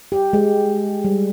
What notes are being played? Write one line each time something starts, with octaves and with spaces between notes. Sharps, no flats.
G4
G#3
G3